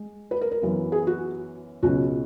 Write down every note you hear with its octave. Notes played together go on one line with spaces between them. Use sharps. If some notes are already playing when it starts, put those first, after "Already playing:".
Already playing: G#3
B4
A#4
A#4
F#2 E3 B3
G#4
F#4
C#2 B2 F#3 C#4 F#4